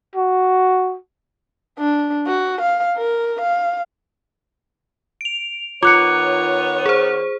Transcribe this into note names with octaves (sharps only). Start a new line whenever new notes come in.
F#4
D4
F#4
F5
A#4
F5
D7 F7
D#3 B3 F4 C#5 D6 F#6 C#7
G#4 C5